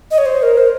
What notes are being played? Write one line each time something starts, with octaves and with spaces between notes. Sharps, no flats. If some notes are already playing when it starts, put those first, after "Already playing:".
D#5
C#5
C5
A#4
C5